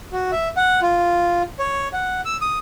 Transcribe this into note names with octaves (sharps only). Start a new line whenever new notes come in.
F#4
E5
F#5
F4
C#5
F#5
E6
D#6